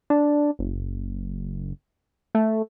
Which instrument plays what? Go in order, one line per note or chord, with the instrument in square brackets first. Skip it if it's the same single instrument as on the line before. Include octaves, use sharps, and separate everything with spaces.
[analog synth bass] D4
F#1
A3